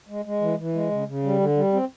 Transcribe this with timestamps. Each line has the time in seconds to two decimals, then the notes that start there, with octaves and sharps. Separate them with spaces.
0.09 G#3
0.25 G#3
0.41 E3
0.58 E3
0.74 G#3
0.91 C#3
1.07 C#3
1.24 G3
1.40 D3
1.57 G3
1.73 C4